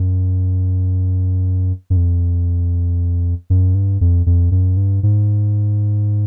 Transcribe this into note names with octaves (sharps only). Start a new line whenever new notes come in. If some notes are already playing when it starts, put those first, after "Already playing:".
Already playing: F#2
F#2
F2
F#2
G2
F2
F2
F#2
G2
G#2